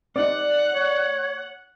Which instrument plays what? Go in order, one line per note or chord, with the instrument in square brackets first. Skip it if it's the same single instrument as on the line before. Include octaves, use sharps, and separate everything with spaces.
[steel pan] C4 D#4 [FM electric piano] D5 [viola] F#5
[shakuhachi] C#5